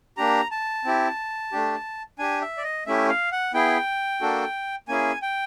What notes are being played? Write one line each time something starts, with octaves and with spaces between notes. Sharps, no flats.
A#3 D4 G4 A#5
A5
C4 E4 G4
A3 D4 G4
D4 G4 G#5
E5
D5
D#5
A3 C#4 E4 G4 E5
F5
F#5
B3 E4 G#4 G5
A#3 D4 F#4 A4
A#3 C#4 E4 G#4 G#5
G5